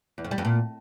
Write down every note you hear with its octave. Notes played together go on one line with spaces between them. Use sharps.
E2
F2
G3
F2
A#2